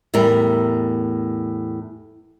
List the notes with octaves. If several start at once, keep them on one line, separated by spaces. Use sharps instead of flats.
E2 A2 G3 A#4